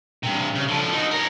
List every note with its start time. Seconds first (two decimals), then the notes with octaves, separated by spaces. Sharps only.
0.23 G2 C3
0.55 C#3
0.68 D3 F3
0.93 D#4 F#4
1.11 A#4 C#5